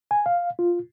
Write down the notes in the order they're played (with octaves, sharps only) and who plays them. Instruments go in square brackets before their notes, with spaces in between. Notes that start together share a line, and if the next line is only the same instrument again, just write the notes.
[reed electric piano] G#5
F5
F4